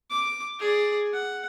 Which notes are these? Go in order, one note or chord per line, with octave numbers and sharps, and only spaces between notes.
D6
G#4 D5
F#5